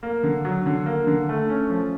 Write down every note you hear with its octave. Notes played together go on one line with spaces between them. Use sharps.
A#3
D3
F#3
D3
A#3
D3
A3
C#4
F3